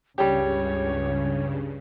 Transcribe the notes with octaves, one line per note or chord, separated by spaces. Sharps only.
C#2 G2 C#3 G3 G4 C#5